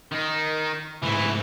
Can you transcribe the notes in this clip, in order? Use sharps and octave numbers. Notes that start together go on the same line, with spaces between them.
D#3 D#4
D2 G#2 E3